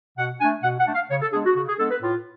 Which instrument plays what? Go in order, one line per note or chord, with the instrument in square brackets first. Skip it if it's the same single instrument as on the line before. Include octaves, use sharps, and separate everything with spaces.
[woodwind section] B2 F#5
A3 D4 G#5
B2 F#5
F#5
A3 D4
F5
C#3 C#5
A4
G#3 B3 D4 G#4
F#4
C#3 F#4
G#4
G#3 B3 D4 A4
B4
A2 F4